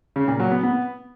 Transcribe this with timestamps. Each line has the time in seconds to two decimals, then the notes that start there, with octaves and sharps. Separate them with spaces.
0.16 C#3
0.28 A#2
0.40 F#3
0.51 B3
0.63 B3